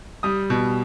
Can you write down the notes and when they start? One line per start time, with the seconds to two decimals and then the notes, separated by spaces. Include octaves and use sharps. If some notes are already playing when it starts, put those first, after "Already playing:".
0.23 G3 D#6
0.50 B2